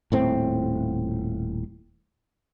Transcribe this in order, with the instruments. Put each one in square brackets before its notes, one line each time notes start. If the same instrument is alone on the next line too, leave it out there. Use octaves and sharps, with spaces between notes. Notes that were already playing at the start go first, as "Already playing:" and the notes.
[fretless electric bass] D#1 A2 C4